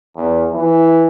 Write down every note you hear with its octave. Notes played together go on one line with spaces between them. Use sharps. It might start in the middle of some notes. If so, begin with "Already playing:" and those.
E2
E3